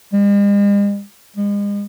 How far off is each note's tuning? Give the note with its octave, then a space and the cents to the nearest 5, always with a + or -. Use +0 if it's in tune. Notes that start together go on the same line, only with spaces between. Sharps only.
G#3 -45
G#3 -35